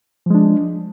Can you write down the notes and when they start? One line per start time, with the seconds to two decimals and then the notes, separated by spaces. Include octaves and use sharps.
0.26 F3
0.30 G#3
0.35 D4